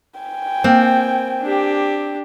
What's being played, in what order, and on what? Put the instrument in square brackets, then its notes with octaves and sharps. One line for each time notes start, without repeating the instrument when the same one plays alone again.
[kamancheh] G5 G#5
[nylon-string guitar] A#3 [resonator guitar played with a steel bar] C4
[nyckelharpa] D4 G4